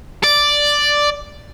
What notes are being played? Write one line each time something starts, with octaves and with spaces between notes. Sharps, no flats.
D5